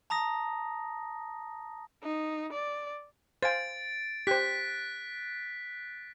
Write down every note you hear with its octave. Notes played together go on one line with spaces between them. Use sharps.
A5 A#5 D#6 A#6
D#4
D5
C5 F5 G#5 A6 D7
G4 C5 F#6 B6